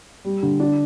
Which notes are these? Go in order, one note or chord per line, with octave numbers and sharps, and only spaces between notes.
G3
D3
D4